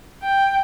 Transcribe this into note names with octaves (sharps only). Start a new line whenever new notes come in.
G5